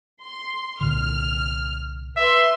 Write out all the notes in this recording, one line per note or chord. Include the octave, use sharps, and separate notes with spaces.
C6
C2 A#2 D3 F6
B4 E5 C6